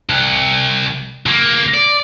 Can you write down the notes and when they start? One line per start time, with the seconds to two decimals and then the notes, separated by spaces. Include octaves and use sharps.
0.09 C2
1.26 C#2 A#3
1.74 D5